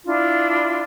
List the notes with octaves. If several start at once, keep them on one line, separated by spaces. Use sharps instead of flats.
D4 E4 F4